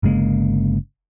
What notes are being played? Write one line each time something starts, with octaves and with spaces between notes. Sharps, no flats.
G1 C#3 G#3 A#3